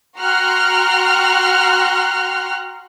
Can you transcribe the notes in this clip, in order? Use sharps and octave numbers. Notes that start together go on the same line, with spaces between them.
F#4 G5 A#5 C6 F6 F#6